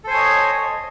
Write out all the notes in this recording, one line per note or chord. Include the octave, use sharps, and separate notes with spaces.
A4 C5 C#5 D#5 G#5